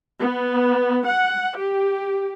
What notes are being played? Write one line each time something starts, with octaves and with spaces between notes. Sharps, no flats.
B3
F#5
G4